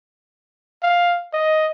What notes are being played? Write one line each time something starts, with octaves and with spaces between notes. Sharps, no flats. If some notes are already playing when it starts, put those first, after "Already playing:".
F5
D#5